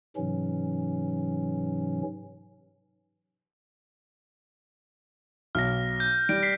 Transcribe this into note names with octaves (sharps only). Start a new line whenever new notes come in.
G#2 C3 E3 F#3 C#4
B1 F6 A#6
G6
G3 D7
B6 C7